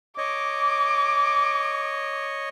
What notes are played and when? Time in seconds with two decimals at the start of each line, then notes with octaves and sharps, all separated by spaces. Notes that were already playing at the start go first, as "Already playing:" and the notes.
0.18 C#5 D#5 D6